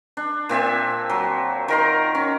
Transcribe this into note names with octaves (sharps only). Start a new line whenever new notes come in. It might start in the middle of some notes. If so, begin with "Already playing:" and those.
D4
A#2 C4 E5 G#5
F#3
D#3 A#4 C6
C#4